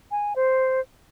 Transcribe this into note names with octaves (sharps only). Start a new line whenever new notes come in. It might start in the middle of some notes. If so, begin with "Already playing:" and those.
G#5
C5